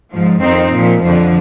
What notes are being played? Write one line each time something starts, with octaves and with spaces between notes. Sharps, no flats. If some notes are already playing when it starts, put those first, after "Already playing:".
G#2 F3
F2 D#3 C4 D#4
A#2 F3
F2 D3 F3